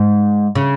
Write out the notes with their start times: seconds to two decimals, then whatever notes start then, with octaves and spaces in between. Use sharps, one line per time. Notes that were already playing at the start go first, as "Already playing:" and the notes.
Already playing: G#2
0.55 C#3